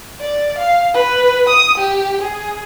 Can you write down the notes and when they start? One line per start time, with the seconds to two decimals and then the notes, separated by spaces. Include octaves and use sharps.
0.21 D5
0.58 F5
0.94 B4
1.49 D#6
1.78 G4
2.21 G#4